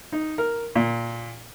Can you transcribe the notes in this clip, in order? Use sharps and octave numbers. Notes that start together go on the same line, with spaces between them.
D#4
A#4
A#2